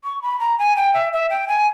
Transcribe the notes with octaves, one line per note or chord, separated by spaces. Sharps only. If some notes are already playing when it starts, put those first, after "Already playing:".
C#6
B5
A#5
G#5
G5
E5
E5
G5
G#5